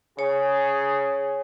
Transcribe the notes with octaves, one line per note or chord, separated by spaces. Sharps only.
C#3 G#4 C#5